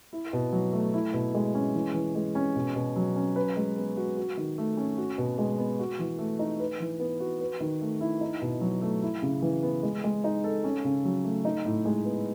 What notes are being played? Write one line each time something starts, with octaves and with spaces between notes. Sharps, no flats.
E4
B2
F#3
A3
E4
B2
G#3
C#4
E3
E3
G#3
C#4
B2
B2
F#3
C#4
B4
G#3
B3
F#4
F#4
D#3
A3
C#4
F#4
B2
G#3
B3
F#4
E3
A3
D#4
B4
E3
B3
F#4
B4
D#3
A3
E4
D#4
B2
F#3
A3
E4
C#3
E3
B3
G#3
G#3
D#4
A4
C#4
C#3
F#3
A3
D#4
A2
G#3
B3